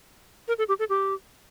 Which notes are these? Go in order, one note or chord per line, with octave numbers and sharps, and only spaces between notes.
A#4
A4
G4
A4
G4